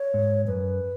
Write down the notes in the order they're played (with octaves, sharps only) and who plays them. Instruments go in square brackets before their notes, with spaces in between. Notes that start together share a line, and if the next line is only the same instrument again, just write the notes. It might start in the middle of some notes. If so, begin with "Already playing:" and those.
Already playing: [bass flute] C#5
[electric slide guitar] G#2
[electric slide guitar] F#2 [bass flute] B4